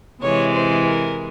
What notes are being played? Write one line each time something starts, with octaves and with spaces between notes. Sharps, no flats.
C3 E3 G#3 C#5
C5
A#4